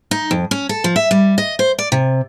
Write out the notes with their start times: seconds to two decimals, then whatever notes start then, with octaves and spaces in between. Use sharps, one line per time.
0.11 D#4
0.31 F2
0.51 C#4
0.69 A4
0.84 F3
0.96 E5
1.11 G3
1.38 D#5
1.59 C5
1.78 D5
1.92 C3